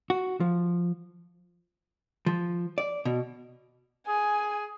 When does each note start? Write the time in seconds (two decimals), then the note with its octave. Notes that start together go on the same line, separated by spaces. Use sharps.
0.10 F#4
0.40 F3
2.26 F3
2.78 D5
3.05 B2
4.08 G#4 G#5